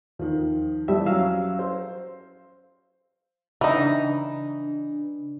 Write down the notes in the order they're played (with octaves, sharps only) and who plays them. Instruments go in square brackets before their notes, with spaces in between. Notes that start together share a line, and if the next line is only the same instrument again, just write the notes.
[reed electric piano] D#2 [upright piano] D#3 F3
[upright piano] F2 E3 [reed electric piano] G3 E5
[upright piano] F#3 C#4 [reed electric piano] F5 E6
[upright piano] C5
[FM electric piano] C#3 D4 [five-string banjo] E3 D#4